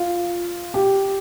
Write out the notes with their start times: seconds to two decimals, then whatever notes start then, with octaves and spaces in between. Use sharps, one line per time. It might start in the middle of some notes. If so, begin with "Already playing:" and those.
Already playing: F4
0.74 G4